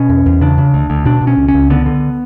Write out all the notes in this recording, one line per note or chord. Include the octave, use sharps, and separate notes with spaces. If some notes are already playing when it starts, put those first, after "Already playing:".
Already playing: B2 C#4
E2
E2
C#3 D4
C#3
D2
D2
B2 D4
B2
C#4
C#2
C#4
C#2
D3 B3
D3